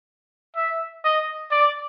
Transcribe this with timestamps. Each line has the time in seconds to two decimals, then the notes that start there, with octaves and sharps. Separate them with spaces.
0.56 E5
1.04 D#5
1.51 D5